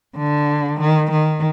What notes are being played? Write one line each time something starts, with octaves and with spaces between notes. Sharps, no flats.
D3
D#3
D#3